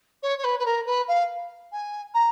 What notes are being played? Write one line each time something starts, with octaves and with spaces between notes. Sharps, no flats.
C#5
C#5
B4
B4
A#4
B4
F5
G#5
A#5